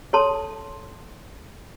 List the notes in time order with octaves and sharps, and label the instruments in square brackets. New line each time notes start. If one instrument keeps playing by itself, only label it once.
[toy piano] A4 C#5 A5 C6